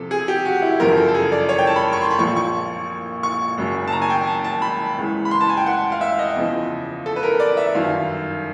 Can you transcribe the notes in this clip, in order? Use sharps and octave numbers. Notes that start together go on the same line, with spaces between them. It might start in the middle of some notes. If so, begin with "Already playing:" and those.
Already playing: E2 C3 F3 A4
G#4
G4
F#4
E4
G1 F#2 C#3 F3 A#4
A4
A4
G#4
D5
C#5
G5
A5
B5
C#6
C6
B5
A#1 A#2 F3 C#6
C#6
C#6
F#1 F#2 C#3
A5
A#5
G#5
G5
A5
A5
B5
C#2 C#3 E3
B5
C6
A5
G#5
G5
F#5
F5
E5
D#5
E2 C#3 F3
A4
B4
A#4
D5
E5
G1 F#2 D#3 F5